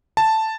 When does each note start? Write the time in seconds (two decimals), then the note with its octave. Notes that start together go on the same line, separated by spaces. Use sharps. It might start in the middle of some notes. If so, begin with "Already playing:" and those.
0.17 A5